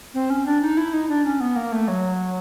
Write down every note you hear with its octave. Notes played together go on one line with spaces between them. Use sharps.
C4
C#4
D4
D#4
E4
D#4
D4
C#4
B3
A#3
A3
F#3